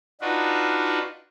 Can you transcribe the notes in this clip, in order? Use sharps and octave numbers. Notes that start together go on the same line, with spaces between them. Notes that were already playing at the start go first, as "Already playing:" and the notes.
D4 D#4 F4 F#4 B4